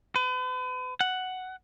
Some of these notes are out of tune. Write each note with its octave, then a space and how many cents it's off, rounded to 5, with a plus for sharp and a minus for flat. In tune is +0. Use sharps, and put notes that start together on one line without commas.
B4 +40
F#5 +5